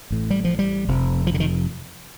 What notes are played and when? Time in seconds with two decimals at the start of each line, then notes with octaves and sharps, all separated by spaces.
0.11 A1 A2
0.30 G3
0.45 F3
0.59 G3
0.88 F1 F2 C3
1.27 F3
1.34 D3
1.40 D#3